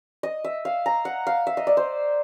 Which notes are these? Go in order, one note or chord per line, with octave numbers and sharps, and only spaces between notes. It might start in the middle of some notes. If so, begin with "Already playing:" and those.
D#5
E5
F5
A#5
F#5
F5
E5
D#5
D5
C5